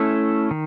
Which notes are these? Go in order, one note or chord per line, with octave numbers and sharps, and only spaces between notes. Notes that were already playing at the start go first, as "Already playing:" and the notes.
Already playing: A3 C#4 E4 A4
D#3